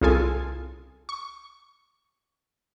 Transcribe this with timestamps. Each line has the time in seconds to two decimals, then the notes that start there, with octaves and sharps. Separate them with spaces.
0.01 C2 C#3 F4 G#4 A4 G#5
1.09 C#6